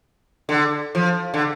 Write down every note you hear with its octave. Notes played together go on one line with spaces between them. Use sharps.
D3
F3
D3